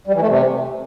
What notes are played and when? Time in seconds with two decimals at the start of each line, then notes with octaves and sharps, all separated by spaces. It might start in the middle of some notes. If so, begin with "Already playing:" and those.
0.07 G3
0.14 E3
0.21 A3
0.27 C3